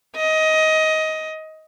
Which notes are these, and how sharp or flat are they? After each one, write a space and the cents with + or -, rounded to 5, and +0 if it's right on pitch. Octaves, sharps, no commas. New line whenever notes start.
D#5 +15